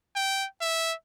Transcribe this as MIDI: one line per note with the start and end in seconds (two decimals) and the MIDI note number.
0.16 0.46 79
0.61 0.94 76